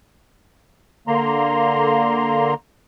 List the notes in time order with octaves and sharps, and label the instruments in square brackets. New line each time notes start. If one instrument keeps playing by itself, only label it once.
[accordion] D3 A#3 A#5 C6